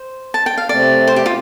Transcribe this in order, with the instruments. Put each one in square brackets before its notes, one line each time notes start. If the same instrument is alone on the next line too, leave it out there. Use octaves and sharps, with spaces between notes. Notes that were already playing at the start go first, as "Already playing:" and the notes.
Already playing: [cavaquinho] C5
A5
G5
F5
[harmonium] C3 A3 C4 [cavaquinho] D5
[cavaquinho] C5
G4
F4